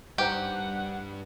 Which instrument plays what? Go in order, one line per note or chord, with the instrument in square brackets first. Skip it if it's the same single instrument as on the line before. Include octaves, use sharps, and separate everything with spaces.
[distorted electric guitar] G2 [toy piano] D#4 C5 A#5 [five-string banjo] G4 [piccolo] F#5